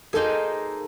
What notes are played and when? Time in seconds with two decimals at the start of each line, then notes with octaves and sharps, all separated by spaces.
0.13 A#3 D#4 G#4 A4 C5 D#5